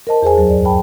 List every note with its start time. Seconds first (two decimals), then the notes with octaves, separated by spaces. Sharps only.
0.07 A#4 C5 D#5 A5
0.22 E2 G#4 C5 G#5
0.35 D2 F#3
0.47 G2 D5
0.65 G5 A5 B5